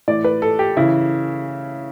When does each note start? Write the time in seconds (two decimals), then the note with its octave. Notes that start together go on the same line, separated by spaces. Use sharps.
0.08 A2 E3 D5
0.24 B4
0.42 A4
0.59 G4
0.77 C#3 E3 E4